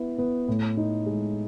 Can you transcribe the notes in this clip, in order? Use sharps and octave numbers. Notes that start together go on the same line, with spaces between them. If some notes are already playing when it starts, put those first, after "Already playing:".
Already playing: B3 E4
B3
A2
D#4
G#3